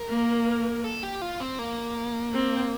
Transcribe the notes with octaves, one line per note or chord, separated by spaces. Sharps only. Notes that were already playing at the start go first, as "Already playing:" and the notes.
Already playing: A#4
A#3
A4
G4
F4
C4
A#3
C4